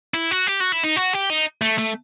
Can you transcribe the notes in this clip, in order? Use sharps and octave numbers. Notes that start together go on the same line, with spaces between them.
E4
F#4
G4
F#4
E4
D#4
F#4
G4
D#4
A3
A3